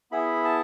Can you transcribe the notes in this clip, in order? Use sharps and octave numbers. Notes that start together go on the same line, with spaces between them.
B3 E4 G#4 B5
A5